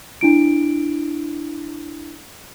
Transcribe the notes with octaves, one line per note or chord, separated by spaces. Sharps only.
D4 E4 D7